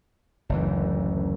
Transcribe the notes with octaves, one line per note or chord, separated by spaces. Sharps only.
F#1 D2 E3